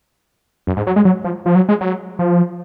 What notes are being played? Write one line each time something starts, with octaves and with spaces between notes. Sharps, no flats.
F#2
G#2
F#3
G#3
F#3
F3
F3
F#3
G#3
F#3
F3